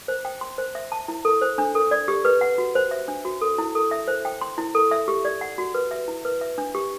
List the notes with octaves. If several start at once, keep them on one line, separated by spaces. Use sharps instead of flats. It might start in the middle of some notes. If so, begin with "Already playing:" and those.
C5
G5
C6
C5
E5
A5
E4
A4
C5
D4
A4
D5
G4
B4
F#5
F#4
C5
E5
D4
F#4
A4
E4
A4
E5
C5
G5
C6
E4
A4
E5
G4
D5
F#5
F#4
B4
E5
E4
B4
E5
D4
G4